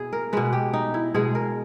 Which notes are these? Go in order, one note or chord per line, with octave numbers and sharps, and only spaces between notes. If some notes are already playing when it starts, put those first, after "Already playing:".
Already playing: B2 E4 G#4
A#4
B2 G#3 B4
G4
D#4
E4
B2 G#3 G#4
A#4